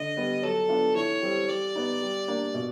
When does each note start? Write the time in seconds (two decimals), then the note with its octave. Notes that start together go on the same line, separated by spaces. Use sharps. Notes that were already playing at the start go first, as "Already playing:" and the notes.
Already playing: D3 D#5
0.17 G3 B3
0.42 F#3 A4
0.69 B3 D4 F4
0.95 E3 C#5
1.22 G3 C4
1.48 G3 D5
1.76 B3 D#4
2.02 G3
2.28 A#3 D4
2.54 B2